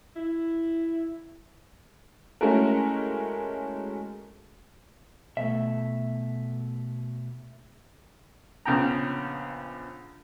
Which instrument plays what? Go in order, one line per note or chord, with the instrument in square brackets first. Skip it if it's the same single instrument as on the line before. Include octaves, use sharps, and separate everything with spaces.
[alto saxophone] E4
[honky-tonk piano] G#3 A3 C#4 E4 F#4 A#4
[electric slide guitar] B2 A3 [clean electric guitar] E5
[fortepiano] A#1 C#3 B3 G5 A#5